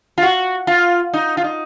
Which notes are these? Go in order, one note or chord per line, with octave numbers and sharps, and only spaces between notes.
F4
F#4
F4
D#4
F4
D#4